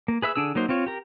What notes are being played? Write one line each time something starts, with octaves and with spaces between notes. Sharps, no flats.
A#3
G#4 B4 E5 E6
D3 D4 G#4 E6
F#3 A#3 D#4 C5
C4 F4 C#5
G4 A#4